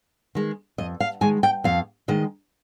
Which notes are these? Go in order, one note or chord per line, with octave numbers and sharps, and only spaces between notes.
D#3 G#3
F2 D#5
F5
D#3 G#3 G#5
G5
F2 F5
D#3 G#3 D#5